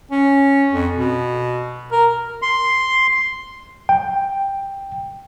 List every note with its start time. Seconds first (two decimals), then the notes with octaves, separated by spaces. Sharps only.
0.11 C#4
0.73 F2
0.96 B2
1.92 A#4
2.42 C6
3.89 G5